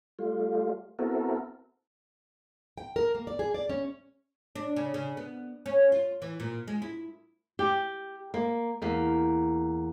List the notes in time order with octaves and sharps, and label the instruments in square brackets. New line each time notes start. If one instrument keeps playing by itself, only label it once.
[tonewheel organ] G3 A3 F4
B3 C4 E4 F#4 A4 A#4
[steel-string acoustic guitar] G5
A#4
A#3
D5
G#4
D5
C#4
[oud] D4
C#3
C#3
B3
C#4
F4
E3
A#2
G#3
E4
[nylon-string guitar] G4
A#3
E2 A#3